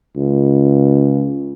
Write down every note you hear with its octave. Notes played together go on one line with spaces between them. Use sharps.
C#2